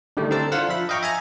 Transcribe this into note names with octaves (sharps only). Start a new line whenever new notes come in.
D3 D#3 G3 A3
D3 C4 E4 A4 A#4 A5
D4 F4 C5 F5 F#5
F3 E5 B5
D#5 F5 G5 A#5 C#6
E5 G#5 A#5